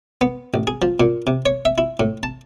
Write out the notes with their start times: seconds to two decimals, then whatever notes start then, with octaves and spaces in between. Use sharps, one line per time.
0.21 B3
0.54 A1
0.67 G#4
0.82 F3
1.00 A#2
1.27 C3
1.46 C#5
1.65 E5
1.78 E4
2.00 A2
2.23 A5